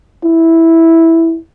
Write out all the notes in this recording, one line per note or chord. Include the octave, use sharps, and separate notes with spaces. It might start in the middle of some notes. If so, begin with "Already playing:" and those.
E4